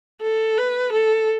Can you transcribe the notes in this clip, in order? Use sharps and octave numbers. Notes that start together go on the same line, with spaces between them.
A4
B4
A4